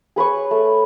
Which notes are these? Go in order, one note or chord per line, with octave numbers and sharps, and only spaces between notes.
G#4 B4 C#5 C#6
A3